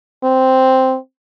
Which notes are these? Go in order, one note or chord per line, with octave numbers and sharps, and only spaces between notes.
C4